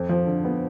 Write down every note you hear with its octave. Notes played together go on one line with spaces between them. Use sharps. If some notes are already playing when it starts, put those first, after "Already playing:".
Already playing: F2
F3
D3
B3